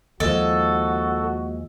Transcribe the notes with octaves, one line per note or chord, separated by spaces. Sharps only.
D#2 F3 G#3 F#4 A4